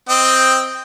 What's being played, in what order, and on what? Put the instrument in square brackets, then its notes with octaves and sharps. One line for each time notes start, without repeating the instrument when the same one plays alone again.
[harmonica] C4 D#5 G5